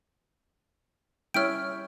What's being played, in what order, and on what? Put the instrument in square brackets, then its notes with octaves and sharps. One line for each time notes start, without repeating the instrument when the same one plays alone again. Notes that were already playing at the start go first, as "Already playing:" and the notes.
[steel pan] G3 C#4 E4 [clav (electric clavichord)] C#5 E5 G5 [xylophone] F6 D7